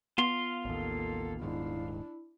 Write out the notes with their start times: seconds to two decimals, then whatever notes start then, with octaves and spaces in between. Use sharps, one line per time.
0.18 B3 F4 F5 C6
0.65 A1 D#2 A#3 A4
1.42 D#1 G#2 D#3 D4 E4